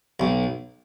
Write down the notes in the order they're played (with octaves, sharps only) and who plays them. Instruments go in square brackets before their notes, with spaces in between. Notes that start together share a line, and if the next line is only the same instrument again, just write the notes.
[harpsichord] B1